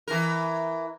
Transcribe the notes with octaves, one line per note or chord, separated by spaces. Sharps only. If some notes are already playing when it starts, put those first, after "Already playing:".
E3 A#4